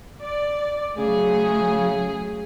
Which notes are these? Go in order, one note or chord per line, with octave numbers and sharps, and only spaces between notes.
D5
C#3 F#3 A3 G#4